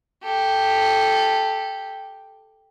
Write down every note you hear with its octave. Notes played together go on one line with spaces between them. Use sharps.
G4 A4